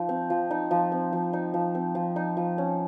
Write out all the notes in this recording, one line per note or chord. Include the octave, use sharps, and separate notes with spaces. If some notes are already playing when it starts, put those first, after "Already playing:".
Already playing: F3 D#4
C4
F3
D#4
F3
C4
F3
D#4
F3
C4
F3
D#4
F3
C#4